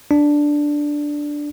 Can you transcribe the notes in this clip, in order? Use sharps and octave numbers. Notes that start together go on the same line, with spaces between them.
D4